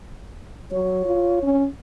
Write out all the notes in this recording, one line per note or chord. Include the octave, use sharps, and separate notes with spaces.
F#3 C#5
F4
C#4